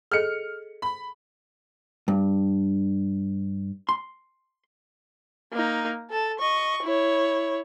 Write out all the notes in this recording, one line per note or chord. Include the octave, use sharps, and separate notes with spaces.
G#4 A4 D#5 F6 C#7
B5
G2
C6
A#3 D#4
A4 A5
D#5 C#6
E4 C#5